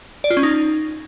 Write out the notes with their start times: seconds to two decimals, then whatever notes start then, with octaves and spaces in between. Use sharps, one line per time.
0.24 D5
0.30 F4
0.37 C#4
0.43 D#4